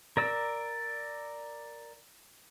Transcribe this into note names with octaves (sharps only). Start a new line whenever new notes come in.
A#4 D5 E6